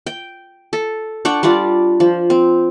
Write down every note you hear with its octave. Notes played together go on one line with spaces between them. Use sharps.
G5
A4
D4 F#5 G5 C#6
G3 D4 F4 D5
F3
C4